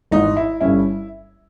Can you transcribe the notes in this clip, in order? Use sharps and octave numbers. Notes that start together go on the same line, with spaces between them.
G#1 G#2 E3 G#3 D#4
E4
G1 G2 G3 C#4 E4